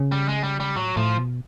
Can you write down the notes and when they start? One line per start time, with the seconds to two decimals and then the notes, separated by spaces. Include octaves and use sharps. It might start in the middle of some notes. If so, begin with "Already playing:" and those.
Already playing: C#3
0.12 G3
0.28 G#3
0.43 G3
0.60 G3
0.76 A2 F#3
0.97 A2 F3
1.18 B2